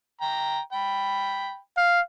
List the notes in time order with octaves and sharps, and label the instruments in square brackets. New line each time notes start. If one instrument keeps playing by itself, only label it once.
[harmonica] G5 A#5
G5 B5
[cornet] F5